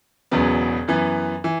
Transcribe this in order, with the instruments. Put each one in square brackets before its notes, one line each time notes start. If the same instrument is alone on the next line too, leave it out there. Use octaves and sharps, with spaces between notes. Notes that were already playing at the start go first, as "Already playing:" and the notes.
[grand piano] E1 E2 C#3 F#3 B3
F#2 E3 B3
E3